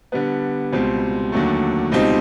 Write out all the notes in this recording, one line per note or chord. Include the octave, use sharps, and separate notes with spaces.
D3 G3 B3
C#2 B2 G3 C4
D#2 D3 F#3 A3
C#2 B2 G3 C4 D#4